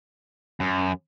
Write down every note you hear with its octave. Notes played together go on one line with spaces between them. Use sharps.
F#2